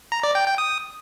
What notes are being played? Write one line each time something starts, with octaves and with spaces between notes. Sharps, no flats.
A#5
D5
G5
G5
D#6